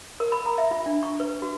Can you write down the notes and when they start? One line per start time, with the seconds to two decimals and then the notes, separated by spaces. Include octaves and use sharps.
0.20 A#4
0.32 B5
0.46 A#5
0.58 E5
0.71 F4
0.86 D4
1.03 C#6
1.20 B4
1.42 F#4